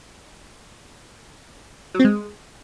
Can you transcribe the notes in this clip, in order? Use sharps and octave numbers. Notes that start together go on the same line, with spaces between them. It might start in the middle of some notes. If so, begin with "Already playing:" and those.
F#3
C4
G#3